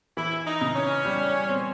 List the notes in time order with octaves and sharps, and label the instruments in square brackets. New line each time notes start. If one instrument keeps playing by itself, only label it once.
[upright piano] E3 [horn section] E4
[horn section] D#4
[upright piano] C#3
[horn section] C#4
[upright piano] G3
C4